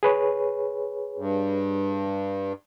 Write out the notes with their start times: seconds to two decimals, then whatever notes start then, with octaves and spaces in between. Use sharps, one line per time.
0.03 G#4 B4 C#5
1.18 G2